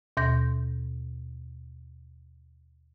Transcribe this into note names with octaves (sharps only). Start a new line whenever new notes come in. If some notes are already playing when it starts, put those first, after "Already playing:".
D#2 B2 G6 A#6